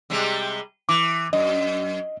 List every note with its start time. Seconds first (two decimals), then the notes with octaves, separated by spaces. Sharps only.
0.10 C3 G3 G#3
0.89 E3 D6
1.33 F#2 D#5